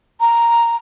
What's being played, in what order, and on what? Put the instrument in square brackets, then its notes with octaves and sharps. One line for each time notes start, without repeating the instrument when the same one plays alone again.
[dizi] A#5